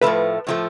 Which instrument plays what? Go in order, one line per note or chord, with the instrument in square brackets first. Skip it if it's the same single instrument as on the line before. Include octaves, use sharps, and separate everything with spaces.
[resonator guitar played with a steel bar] A2 F3 A3 [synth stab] B4
[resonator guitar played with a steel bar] A2 F3 A3